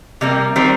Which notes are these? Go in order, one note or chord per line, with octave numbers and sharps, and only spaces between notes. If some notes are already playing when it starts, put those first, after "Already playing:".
C3 G3 A#3
D#3 G3 C4